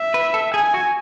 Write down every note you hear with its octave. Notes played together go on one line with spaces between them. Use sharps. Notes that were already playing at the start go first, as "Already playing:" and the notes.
Already playing: E5
B4
A4
G#4 G#5
F#4